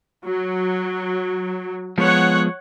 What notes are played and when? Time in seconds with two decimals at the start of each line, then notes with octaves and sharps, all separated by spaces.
0.25 F#3
1.98 F3 G#3 B3 C#5 F#5